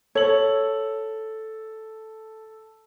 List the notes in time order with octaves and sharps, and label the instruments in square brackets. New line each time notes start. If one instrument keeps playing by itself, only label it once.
[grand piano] A4 F#7 [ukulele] C#5